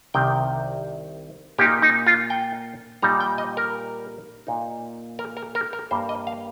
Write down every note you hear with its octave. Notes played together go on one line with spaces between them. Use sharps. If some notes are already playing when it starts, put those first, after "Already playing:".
C2 C3 D#3 C4 G5
A#2 A#3 D#4 G4
D#4
F4
G5
A#2 G3 D#4 A#5
G5
D#5
A#4
A#2 A#3 D#4
A#4
A#4
A#4
A#4
G2 G3 A#3 C5
D#5
F5